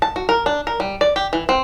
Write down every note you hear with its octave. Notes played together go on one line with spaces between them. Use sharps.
A5
F#4
A#4
D4
A#4
G3
D5
G4
E3
C4